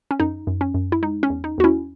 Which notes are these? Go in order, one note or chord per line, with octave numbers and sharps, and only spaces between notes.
C#4
F#2 D#4
F#2
C#4
F#2
E4
G#3 D#4
C#4
E2
D#4
E2 F#4
C#4 E4